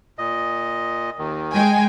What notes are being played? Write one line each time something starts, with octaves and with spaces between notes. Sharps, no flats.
A#2 D#5
D#2 D#3
G#3 G5 G#5